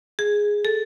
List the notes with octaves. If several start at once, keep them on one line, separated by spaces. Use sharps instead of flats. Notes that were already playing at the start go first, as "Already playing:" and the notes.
G#4
A4